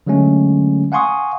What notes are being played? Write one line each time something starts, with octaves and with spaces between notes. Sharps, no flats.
D3 F#3 G#3 A3 C#4
F5 F#5 G#5 C6 C#6 D#6